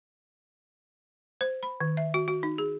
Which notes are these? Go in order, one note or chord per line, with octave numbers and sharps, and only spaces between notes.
C5
B5
D#3
E5
F#4
F#4
D#4
G#4